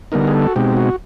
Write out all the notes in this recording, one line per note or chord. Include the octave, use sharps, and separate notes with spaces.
D3 G3 B3 D#4 A#4
G#4
A4
F#4
B2 G#3 C4 D#4 G4
F#4